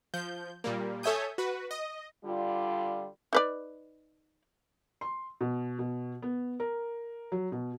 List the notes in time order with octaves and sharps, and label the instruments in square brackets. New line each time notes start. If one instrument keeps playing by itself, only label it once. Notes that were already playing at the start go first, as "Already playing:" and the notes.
[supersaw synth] F3 G6
A#2 G3 A#3
A4 C#5 E5 G#5 D#6 G6
F#4 B4
D#5
[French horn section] D3 G3 F4
[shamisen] D#4 B4 D5
[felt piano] C6
B2
B2
B3
A#4
F#3
B2